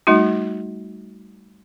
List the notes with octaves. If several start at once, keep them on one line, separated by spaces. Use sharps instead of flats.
G3 A3 D#4 F#4